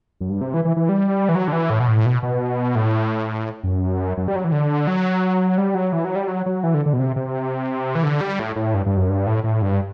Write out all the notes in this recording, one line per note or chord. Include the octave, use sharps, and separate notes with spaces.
F#2
G2
C3
E3
E3
E3
G3
E3
F#3
D3
E3
A2
B2
A2
B2
B2
A2
F#2
F#2
G3
F#3
E3
D3
F#3
G3
F#3
E3
F#3
G3
F#3
F#3
E3
D3
D3
B2
C3
C3
E3
D3
G3
A2
A2
G2
G2
F#2
G2
A2
A2
G2